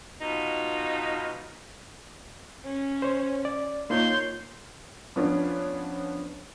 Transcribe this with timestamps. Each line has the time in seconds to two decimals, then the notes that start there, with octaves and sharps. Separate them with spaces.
0.22 B2 D#4 F4
2.63 C#4
3.02 C5 C#5
3.45 D5
3.90 A#3 D#4 F4 C#5 C6 G6
5.16 F3 B3 C#4 D4